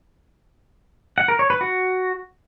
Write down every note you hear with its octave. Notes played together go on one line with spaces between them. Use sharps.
F#5
A#4
C#5
B4
F#4